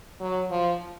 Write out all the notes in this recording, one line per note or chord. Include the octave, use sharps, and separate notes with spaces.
F#3
F3